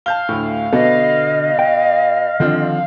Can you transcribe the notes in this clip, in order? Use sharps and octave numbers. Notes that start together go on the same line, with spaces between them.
F5 A5 G6 G7
D2 A2
B2 D3 B3 A4 D#5
G5
D3 D#3 F3 C4